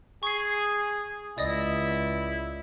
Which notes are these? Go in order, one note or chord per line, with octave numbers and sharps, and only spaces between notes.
G#4 C#6 C7
C#2 E4 D5 D#5 D#6